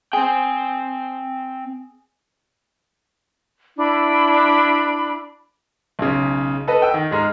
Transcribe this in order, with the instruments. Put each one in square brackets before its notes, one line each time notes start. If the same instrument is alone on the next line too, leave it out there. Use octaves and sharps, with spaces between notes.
[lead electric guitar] C4 G5 [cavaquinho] G#4
[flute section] D4 E4 B5
[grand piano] B1 C#3
A4 B4 D#5
G5 E6
D#3
G#2 G#3 A#5 F6